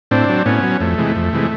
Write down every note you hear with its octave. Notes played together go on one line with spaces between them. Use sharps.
A2 C4 D4
F#3
A2 B3 C#4
F#3
F2 A3
C3 E3 G#3
F2
C3 E3 G#3